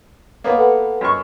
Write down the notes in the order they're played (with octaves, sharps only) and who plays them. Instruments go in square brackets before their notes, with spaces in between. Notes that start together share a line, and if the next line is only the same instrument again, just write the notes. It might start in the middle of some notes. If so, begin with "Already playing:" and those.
[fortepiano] A#3 B3 [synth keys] C#5
[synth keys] A4 B4 F#5
[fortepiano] F#2 C#6